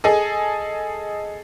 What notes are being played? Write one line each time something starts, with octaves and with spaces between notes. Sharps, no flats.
G#4 A4 D#5 G#5